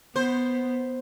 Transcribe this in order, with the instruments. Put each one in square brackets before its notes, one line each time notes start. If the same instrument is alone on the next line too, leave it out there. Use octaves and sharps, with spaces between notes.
[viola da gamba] B3 [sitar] C5